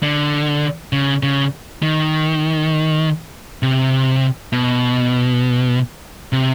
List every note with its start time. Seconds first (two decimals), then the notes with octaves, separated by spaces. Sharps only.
0.03 D3
0.93 C#3
1.23 C#3
1.83 D#3
3.63 C3
4.52 B2
6.32 C3